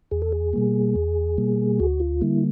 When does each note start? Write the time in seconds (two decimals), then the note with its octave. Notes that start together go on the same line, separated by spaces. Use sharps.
0.11 E2 G#4
0.22 A4
0.32 G#4
0.53 B2 G3 A#3
0.96 E2
1.38 B2 G3 A#3
1.79 D2 F#4
2.00 F4
2.21 D3 G3 A#3 E4